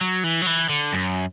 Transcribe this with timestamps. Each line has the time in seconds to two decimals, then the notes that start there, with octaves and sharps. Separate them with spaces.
0.01 F#3
0.24 E3
0.42 F#3
0.47 E3
0.69 D3
0.93 F#2